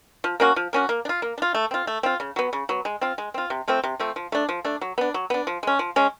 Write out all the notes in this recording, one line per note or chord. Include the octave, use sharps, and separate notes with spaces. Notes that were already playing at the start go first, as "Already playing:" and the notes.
F3
A#3 C#4 F#4
F3
A#3 C#4 F#4
A#3
D4
F4
A#3
D4
F4
A3
C4 F4
A3
C4 F4
C#3
F#3 B3
C#3
F#3 B3
G#3
C4 F4
G#3
C4 F4
C3
F3 A3 C4
C3
F3 A3 C4
F3
A3 D4
F3
A3 D4
F#3
B3 D4
F#3
B3 D4
F3
G#3 C#4
F3
G#3 C#4